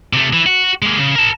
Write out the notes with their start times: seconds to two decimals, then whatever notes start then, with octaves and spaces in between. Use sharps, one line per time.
0.13 C3 A3
0.33 E3
0.46 F#4
0.82 G#3 A#3
0.98 C#3
1.15 A#4 A5